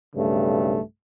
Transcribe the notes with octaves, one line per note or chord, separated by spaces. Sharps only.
B1 G2 C#3 A3